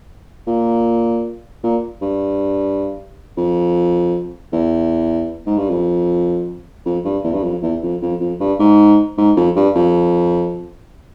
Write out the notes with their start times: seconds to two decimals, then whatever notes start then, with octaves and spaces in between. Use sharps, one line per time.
0.47 A#2
1.63 A#2
2.02 G2
3.37 F2
4.53 E2
5.46 G#2
5.58 G2
5.69 F2
6.85 F2
7.05 G2
7.24 E2
7.34 G2
7.43 F2
7.62 E2
7.82 F2
8.02 F2
8.20 F2
8.40 G2
8.59 G#2
9.17 G#2
9.37 F2
9.56 G2
9.75 F2